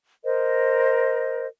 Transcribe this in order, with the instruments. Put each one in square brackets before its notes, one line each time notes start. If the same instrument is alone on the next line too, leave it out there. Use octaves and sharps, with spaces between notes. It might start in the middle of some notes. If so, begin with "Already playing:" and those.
[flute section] A#4 C5 D#5